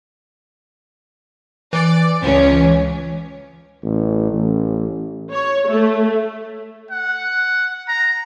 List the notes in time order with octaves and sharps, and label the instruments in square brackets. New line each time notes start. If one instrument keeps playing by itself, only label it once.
[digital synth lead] E3 [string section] D5
[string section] C#2 C#4
[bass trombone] A1
A1
[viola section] C#5
A3
[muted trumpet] F#5
A#5